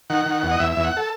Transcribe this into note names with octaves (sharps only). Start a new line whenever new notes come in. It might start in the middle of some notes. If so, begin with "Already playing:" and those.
D#3 F#5
D#3
E2
D#5
E2 E5
E2 E5
F#5
A4